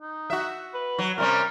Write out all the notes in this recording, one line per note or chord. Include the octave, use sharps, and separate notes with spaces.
D#4
F#4 E5
B4
F#3
C3 G3 C#4 A#4